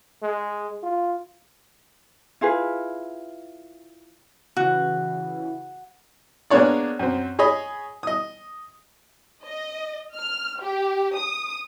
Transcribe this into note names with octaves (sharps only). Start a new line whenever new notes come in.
G#3
F4
E4 F4 G#4 B4
C#3 E3 F#4
G#3 A#3 B3 D4 C#5 D5
F#2 C4
G#4 C#5 D#5 B5
D#5 D#6
D#5
F6
G4
D#6